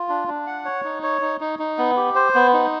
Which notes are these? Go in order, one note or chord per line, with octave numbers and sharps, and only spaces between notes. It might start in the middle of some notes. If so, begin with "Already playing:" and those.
Already playing: F4
D4
D4
F#5
C#5
D#4
C#5
D#4
D#4
D#4
B3
G4
C5
B3
D#4